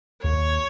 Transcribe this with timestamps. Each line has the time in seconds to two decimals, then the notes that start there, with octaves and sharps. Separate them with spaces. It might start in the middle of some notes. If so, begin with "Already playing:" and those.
0.23 D#2 C#5